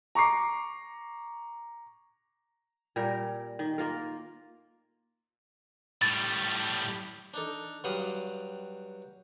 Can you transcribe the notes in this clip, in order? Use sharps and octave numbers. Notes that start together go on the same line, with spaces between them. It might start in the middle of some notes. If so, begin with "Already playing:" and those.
A#5 C#6 D6 C7
A#2 G3 G4 A#4
D#3
A#3 F4 A#4
A2 G3 A6
D4 D#4 A4
G2 F#3 F5 G5 B5 D#6